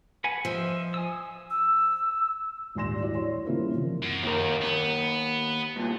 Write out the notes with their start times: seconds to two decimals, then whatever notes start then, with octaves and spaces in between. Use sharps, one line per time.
0.24 B4 F#5 G#5
0.45 F3 D#5 E5
0.94 G#5 D#6 E6
1.50 E6
2.75 D#1 G#2 D5 C6 A#6 E7
3.00 E4 F#4 D5
3.14 A2 C#5 C6
3.45 C#3 G3 A#3 E4 F4 C5
3.74 C3 F3
4.03 F#2
4.23 D#2 D#3 A#4
4.62 D#2 B3
5.76 G2 A#2